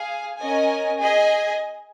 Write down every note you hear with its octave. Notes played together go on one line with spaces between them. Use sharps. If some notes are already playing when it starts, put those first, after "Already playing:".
Already playing: G#4 F5 G#5
C#4 A#4 D#5 G#5
G#4 D#5 G#5